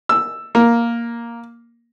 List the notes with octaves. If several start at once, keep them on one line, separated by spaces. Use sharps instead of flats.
E6
A#3